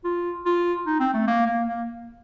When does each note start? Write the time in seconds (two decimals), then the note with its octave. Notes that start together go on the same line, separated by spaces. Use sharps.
0.04 F4
0.45 F4
0.86 D#4
1.00 C4
1.14 A3
1.27 A#3
1.47 A#3
1.68 A#3